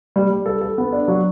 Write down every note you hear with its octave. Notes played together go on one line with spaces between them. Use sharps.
G3
G3
A4
A4
B3
D4
F#3